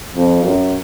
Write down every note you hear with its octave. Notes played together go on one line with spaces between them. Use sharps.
F2
F#2